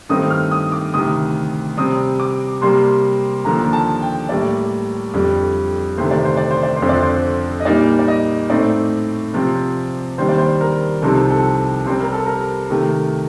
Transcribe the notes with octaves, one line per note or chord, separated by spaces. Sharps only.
G2 D#3 A3 C4 D#4 D#6
F6
D#6
D6
D2 C3 D#3 D#6
C3 G3 C4 D#6
D6
C3 G3 A#3 C6
D#2 D3 F3 A#3 A#5
A5
G5
A2 G3 A#3 D5
F2 D3 G3
D2 C3 D#3 A3 C5
D5
C5
D5
C5
D5
C5
F2 D3 F3 C4
D5
C5
D#5
A#2 G3 A#3 D#4 D5
D5
D#5
A2 A3 C4 D#4 D5
C3 F3 C4
D#2 D#3 G3 D4 C5
D5
C5
A#4
C2 C3 F3 C4 D#4 A4
A4
C3 G3 C4 C5
A#4
A4
A#4
C3 D#3 A3